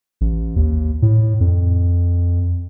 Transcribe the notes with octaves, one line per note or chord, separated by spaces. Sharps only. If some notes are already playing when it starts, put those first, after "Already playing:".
A1
D#2
A2
F2